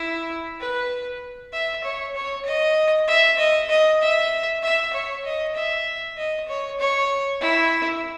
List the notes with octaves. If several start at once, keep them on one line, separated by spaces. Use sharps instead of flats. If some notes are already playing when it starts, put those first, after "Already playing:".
Already playing: E4
B4
E5
C#5
C#5
D#5
E5
D#5
D#5
E5
E5
C#5
D#5
E5
D#5
C#5
C#5
E4